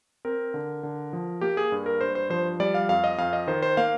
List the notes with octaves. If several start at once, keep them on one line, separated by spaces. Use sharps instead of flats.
C4 A#4
D3
D3
F3
A#3 G4
G#4
G2
A#4
G2 C5
C5
F3 C5
G3 D5
F5
F2 F5
D#5
F2 F5
D#5
D#3 C5
C5
A#3 F5